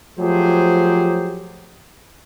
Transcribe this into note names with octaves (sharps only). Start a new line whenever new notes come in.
F3 F#3 A3 G4 G#4 C5